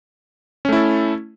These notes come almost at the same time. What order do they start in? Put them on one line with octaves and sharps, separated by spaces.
C#4 A3 E4 A4